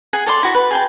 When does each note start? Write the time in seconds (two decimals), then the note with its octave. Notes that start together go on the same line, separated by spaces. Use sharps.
0.13 G#4 F#5 G#5
0.26 A4 C#5 D5 C6
0.43 E4 F#4 C#6
0.55 B4
0.71 G#4 G5 A5